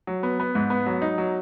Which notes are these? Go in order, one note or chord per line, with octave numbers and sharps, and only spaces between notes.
F#3
B3
B3
G#2
B3
F#3
D#4
F#3